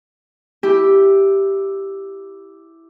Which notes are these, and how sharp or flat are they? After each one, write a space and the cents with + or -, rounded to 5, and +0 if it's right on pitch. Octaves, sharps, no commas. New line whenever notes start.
E4 +0 G4 +0